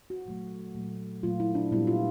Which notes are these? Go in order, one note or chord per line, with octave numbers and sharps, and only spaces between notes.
F#4
A#2 F#3 A3
A#2 F#3 A3
A#2 F#3 A3 F4
E4
D4
A#2 G3 B3 E4
F4